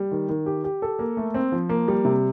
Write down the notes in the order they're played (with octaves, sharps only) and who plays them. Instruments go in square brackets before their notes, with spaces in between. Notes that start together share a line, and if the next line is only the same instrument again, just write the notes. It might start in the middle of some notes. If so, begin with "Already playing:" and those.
Already playing: [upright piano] G3
D#3
D#3
G4
G4
A4
A#3
A3
C4
F3
A#3
G3
C3